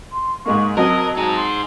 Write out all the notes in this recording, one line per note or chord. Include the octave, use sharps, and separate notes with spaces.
C6
G#2 G#3 A#3 C#6
F#3 C4 A#4 D#5 A5
D#4 G#4 A#5
C6